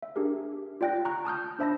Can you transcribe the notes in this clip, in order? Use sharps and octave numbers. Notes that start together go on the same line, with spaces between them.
E5
D4 G4 G#4 A#4
F4 D5 G5 F#6 A#6
A#5 C#6 F#6
A5 D#6 F6 G6
D4 C5 E5 A5 B5 A#6